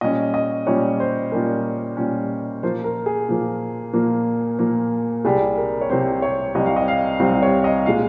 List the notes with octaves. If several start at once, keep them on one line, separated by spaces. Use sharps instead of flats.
A#2 G3 C#4 D#5
D#5
A#2 G3 C#4 C#5
C5
A#2 G3 C#4 A#4
A#2 G3 C#4
A#2 F3 A#3 C5
A#4
G#4
A#2 F3 A#3
A#2 F3 A#3
A#2 F3 A#3
C2 C3 G3 C4 G#4
A#4
C#5
C2 C3 G3 C4 C5
C#5
C2 C3 G3 C4 D#5
F5
D#5
F5
C2 C3 G3 C4
C#5
D#5
A#2 G#3 F5